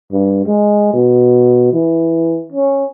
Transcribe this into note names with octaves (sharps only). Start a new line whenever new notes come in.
G2
G#3
B2
E3
C#4